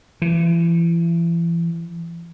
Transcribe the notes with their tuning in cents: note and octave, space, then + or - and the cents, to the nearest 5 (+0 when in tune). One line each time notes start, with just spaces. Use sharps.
E3 +35